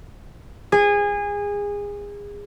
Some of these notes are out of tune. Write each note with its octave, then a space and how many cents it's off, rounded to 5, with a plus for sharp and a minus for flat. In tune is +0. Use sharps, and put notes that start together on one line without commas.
G#4 -25